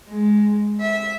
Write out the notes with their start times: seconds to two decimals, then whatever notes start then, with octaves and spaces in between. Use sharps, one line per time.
0.10 G#3
0.80 E5